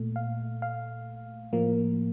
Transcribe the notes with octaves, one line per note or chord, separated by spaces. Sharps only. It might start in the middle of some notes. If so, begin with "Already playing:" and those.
Already playing: A#2 A3
F5
F5
A2 F3 A#3